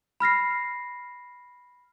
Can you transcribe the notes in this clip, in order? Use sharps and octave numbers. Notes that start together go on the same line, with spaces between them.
B5 F6 A#6 C7